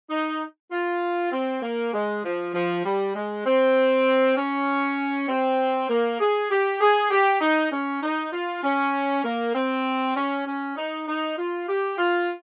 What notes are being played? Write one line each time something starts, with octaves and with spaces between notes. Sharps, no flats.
D#4
F4
C4
A#3
G#3
F3
F3
G3
G#3
C4
C#4
C4
A#3
G#4
G4
G#4
G4
D#4
C#4
D#4
F4
C#4
A#3
C4
C#4
C#4
D#4
D#4
F4
G4
F4